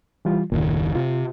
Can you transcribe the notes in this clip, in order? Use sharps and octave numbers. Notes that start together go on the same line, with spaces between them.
E3 G3 F4
F#1 D#2 A#2 D#3
C3 F4